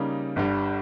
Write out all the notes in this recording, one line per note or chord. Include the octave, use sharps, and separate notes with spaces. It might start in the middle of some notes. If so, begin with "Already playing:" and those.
Already playing: C#3 G3 A#3 D#4
G1 G2 G3